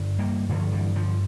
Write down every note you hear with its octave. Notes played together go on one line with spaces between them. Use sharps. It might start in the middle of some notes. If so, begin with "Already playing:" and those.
Already playing: G2 D3
G3 A#3
G2 D3 F3 A3
E3 G3
D3 F3